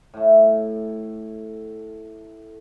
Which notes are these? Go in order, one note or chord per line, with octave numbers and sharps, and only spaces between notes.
A2 A3